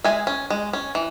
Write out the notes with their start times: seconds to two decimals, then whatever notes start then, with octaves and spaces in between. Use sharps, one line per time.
0.04 G#3 E5 G#5
0.27 C#4
0.50 G#3
0.73 C#4
0.95 E3